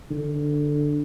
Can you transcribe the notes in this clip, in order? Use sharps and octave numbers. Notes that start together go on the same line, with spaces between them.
D3